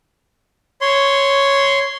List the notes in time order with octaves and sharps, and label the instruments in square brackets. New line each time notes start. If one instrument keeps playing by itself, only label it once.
[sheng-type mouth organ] C#5 C6